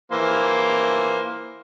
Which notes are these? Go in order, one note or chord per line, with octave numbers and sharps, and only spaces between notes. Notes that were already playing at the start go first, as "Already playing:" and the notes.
E3 A#3 C5